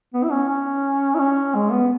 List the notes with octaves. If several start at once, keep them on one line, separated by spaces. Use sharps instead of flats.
B3
E4
C#4
C#4
E4
C#4
G#3
B3